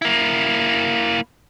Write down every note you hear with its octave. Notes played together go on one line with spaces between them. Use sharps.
A#3 E4